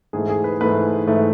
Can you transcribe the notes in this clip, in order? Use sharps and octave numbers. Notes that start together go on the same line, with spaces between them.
G#2 E3 A3 G#4
G#4
B4
G#2 E3 A3 B4
G#2 E3 A3